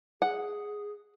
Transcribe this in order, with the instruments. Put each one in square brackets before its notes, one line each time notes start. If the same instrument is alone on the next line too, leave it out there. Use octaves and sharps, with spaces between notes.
[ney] G#4 [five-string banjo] F#5